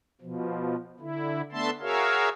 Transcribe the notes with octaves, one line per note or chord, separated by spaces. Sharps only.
B2 F3
D3 E4
A3 B3 D4 E5 A5 C6
F#4 G#4 A#4 C#5 E5 F5